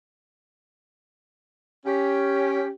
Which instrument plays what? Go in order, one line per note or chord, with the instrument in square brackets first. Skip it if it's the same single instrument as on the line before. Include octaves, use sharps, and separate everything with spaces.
[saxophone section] C#4 G4